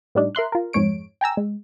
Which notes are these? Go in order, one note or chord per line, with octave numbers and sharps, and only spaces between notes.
A2 G3 D4 D#4
A#4 E5 C6 F#6
F4 A#4
F2 G#2 G#3 C#5 D7
G5 G#5 A#5 E6
G#3